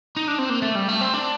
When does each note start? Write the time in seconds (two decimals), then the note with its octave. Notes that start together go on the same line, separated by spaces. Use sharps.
0.17 D#4
0.28 D4
0.39 C4
0.50 A#3
0.62 A3
0.76 G3
0.89 A3
1.01 C4
1.14 D4